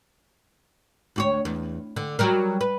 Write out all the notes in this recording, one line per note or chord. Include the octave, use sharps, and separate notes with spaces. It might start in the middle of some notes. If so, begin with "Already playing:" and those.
D2 F#4 C#5
E2
D3
F#3 G3 A#4
B4